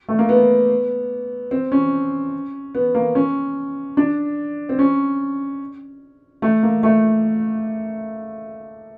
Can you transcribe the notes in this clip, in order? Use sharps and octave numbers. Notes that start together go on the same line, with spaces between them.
A3
A#3
B3
C4
C#4
B3
A#3
C#4
D4
C4
C#4
A3
A#3
A3